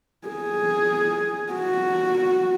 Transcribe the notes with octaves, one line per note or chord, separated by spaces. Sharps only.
G#4
F#4